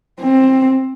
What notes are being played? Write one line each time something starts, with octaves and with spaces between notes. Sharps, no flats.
C4